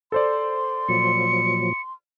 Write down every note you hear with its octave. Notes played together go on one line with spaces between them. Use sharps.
A4 C5 D5 C6
A#2 F3 F#3 C#7